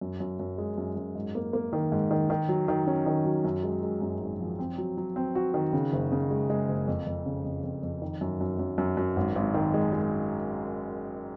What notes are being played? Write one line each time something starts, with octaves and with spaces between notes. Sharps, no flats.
F#2
F#2
F#2
G#3
F#2
F#2
G#2
A#3
A#3
D#3
G#2
D#3
D#3
F#3
D#3
C#4
D#3
F#3
F#2
G#3
G#3
F#2
G#1
F3
C4
F#3
F#3
C4
F#4
D#3
C#3
F#1
C#3
G#3
G#3
F#1
F2
F2
C#3
F2
F2
F2
D#3
F#2
F#2
F#2
F#2
F#2
G#1
G#1
D#3
G#3
G#3